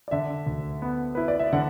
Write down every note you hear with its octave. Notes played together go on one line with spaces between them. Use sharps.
D5
D3 E5
D2
B3
E4 B4
D5
E5
D3 F#5